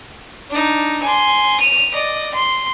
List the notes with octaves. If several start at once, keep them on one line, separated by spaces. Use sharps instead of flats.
D4 D#4
G#5 C6
D#7 F7
D5 D#5
C6